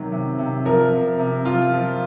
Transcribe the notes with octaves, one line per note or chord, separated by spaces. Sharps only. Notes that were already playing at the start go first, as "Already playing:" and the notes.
Already playing: C3 D#3 F#3
C3
C3
F3 A#4
C3
C3
F3 F4
F3